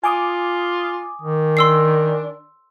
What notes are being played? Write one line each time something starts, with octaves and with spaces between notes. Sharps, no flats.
F4 G#5 D6 D#6
D#3
D4 C6 E6 C7